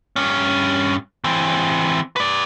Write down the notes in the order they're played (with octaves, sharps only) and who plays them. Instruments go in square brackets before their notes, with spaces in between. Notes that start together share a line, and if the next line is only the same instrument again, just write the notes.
[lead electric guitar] G2 C#4
E3 C4
B4 D5